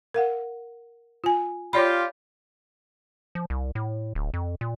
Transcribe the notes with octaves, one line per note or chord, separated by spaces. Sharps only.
A#4 F5 F#5
F4 G#5
F4 G4 C#5 D5 B5
F3
C2
A2
D1
F2
A#2